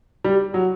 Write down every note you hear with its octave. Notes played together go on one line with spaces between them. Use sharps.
G3
F#3